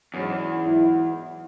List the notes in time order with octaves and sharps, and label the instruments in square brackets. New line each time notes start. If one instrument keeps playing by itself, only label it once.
[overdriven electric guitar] E2 [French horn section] G#2 F#3 C#4
[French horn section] G#2 F#3 E4